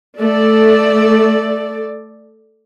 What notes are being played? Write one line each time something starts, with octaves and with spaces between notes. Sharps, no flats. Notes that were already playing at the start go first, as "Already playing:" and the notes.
A3 A4 D5